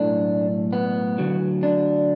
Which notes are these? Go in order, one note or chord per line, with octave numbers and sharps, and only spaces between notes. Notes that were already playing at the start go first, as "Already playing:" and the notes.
Already playing: B1 A2 A3 D4
B3
D2 D3 F#3
D4